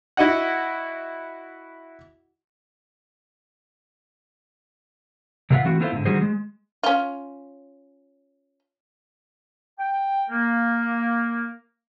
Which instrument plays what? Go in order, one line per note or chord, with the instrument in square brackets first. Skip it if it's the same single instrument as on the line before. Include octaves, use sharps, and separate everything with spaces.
[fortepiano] E4 F#4 D#5 F#5
[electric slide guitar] C3 A3 F4 A#4 E5 F#5
E3 A3 C4 F#4
B3 E4 F4 A4 C5 E5
G#2 D3
D3 D#3 G3 F#4 G#4 C5
G#3
[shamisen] C#4 F4
[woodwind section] G5
A#3